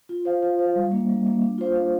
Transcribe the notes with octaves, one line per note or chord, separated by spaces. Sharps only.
F4
C5 F5
F4
C5 F5
G3
A#3 D4
G3
A#3 D4
D4
F4 C5 F5
D4